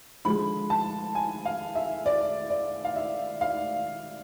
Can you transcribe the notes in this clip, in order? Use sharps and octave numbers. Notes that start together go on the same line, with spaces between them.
D3 F3 G#3 B5
A5
G#5
F5
E5
D5
D5
F5
E5
F5